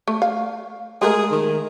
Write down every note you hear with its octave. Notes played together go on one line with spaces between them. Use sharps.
A3
F5
G#3 A3 G#4 A#4
D#3